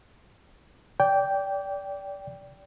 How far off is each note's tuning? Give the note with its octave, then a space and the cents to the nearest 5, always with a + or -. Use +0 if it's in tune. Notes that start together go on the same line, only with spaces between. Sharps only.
D5 -25 G5 +0